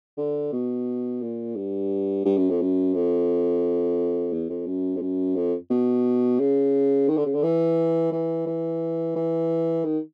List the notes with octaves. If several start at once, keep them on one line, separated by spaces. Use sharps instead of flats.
D3
B2
A#2
G2
G2
F#2
F2
F#2
F2
E2
F2
F#2
F2
F#2
F2
B2
C#3
D#3
D3
C#3
D3
E3
E3
E3
E3
D#3